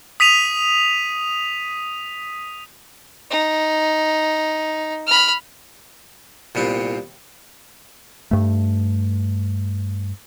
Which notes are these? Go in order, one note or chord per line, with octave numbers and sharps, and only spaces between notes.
D#6 B6 D#7 F7
D#4
B5 F6
C2 A#2 B3 C4
G2 A3